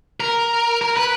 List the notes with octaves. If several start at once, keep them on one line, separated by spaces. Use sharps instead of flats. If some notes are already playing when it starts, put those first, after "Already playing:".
A#4
A#4
B4